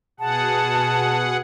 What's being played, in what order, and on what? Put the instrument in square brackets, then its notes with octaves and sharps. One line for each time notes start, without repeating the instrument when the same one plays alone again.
[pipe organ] B2 G#4 F#5 [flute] A5